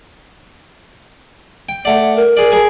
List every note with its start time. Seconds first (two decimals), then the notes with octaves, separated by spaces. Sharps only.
1.69 G5
1.85 A3 D5 F#5
2.16 A#4
2.37 G#4 D5
2.52 G#4 A#4 G#5